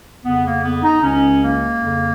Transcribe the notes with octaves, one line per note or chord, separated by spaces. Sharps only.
F2 C#3 B3
A#3
B3
D#4
C#2 C#3 C#4
A#3
F2 C#3